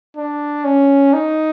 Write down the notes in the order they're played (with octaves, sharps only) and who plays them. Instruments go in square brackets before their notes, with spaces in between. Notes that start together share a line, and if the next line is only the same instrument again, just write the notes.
[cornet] D4
C#4
D#4